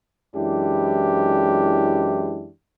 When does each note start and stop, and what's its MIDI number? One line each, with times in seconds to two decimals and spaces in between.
0.35 2.49 42
0.35 2.49 52
0.35 2.49 56
0.35 2.49 62
0.35 2.49 64
0.35 2.49 67